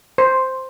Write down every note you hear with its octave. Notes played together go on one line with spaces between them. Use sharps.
C5